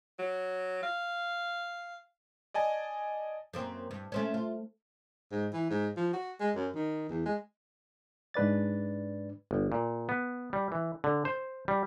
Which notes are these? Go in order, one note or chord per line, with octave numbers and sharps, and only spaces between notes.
F#3
F5
D5 D#5 G#5 A5
F#2 A#3 C4
G2
A3 C4 C#4
F4
G#2
E3
G#2
F3
F#4
G#3
F#2
D#3
E2
G#3
G#2 D4 B4 D5 A6
G1
A#2
B3
G3
E3
D3
C5
G3